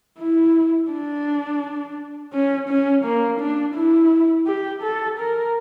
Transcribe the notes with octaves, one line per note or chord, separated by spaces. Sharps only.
E4
D4
C#4
C#4
A#3
D4
E4
G4
A4
A#4